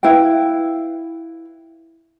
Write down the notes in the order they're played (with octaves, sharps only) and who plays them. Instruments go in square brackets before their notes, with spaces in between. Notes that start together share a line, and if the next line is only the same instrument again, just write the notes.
[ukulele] E4 B4 F5 G5